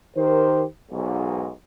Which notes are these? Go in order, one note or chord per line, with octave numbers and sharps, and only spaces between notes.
D#3 G4 A#4 C5
B1 G#2